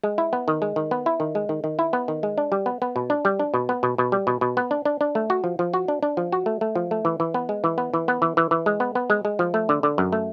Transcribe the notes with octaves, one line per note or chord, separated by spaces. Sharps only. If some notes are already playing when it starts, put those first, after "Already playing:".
G#3
E4
B3
D#3
G#3
D#3
B3
E4
D#3
G#3
D#3
D#3
E4
B3
D#3
G#3
D4
G3
B3
B3
B2
D4
G3
D4
B2
B3
B2
B2
G3
B2
B2
B3
D4
D4
D4
A3
F#4
F3
F3
F#4
D4
D4
F3
F#4
A3
A3
F3
A3
E3
E3
B3
G#3
E3
B3
E3
B3
E3
E3
E3
G#3
B3
B3
G#3
G#3
F3
A3
D3
D3
F#2
A3